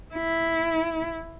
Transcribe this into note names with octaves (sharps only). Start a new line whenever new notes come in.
E4